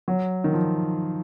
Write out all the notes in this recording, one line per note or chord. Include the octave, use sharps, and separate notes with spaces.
F#3
D#3
F3